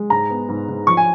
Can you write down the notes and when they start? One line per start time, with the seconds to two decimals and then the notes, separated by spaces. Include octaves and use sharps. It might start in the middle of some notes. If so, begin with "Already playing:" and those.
Already playing: G#3
0.10 G#2 A#5
0.30 B3
0.49 G#2
0.69 G#2
0.87 F3 C#6
0.97 G#5